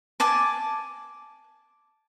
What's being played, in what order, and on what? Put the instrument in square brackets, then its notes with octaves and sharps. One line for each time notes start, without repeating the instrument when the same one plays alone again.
[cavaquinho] G#5 A5 D6